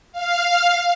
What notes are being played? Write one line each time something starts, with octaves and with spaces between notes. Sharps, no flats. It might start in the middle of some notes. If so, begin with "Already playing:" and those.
F5